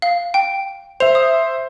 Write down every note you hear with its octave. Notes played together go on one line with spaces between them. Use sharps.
F5
G5
C5 E5 F7
D#6